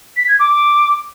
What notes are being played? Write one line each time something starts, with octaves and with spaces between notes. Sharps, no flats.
B6
G#6
D6